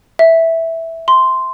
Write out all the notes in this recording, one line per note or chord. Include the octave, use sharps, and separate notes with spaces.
E5
C6